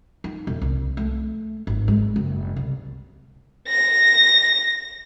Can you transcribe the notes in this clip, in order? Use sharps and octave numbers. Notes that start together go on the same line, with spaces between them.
D#4
E1
C2
A3
G#1
G#3
F#1
C2
A#6